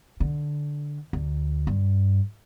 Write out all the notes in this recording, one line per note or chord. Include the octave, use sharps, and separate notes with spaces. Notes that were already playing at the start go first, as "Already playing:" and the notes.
D3
D2
G2